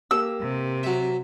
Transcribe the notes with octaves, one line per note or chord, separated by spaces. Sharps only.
A#3 G4 E6
C3
F#3 E5